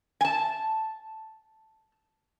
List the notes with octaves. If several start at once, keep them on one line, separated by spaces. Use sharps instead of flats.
G#5 A5